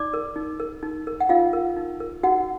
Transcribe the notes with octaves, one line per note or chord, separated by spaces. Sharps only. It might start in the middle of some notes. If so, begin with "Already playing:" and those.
Already playing: D#4 D5 D6
A#4
D#4
A#4
D#4
A#4
F#5
D#4 F4 F5
A#4
D#4
A#4
D#4 F#4 F#5